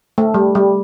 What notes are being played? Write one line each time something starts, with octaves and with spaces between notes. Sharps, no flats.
A3
G3
G3